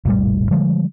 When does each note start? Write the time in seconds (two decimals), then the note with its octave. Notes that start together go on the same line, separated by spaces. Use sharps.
0.05 F1 A#1 A2 G3
0.51 D3 F3 G3 G#3